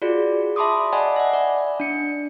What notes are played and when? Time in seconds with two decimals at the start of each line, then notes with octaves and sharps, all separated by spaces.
0.02 F4 F#4 G#4 D5
0.56 E5 A5 B5 C6 D6 D#6
0.92 D5 D#5 F#5 G#5 A5 B5
1.16 E5 F#5
1.33 D5
1.80 D4 C#7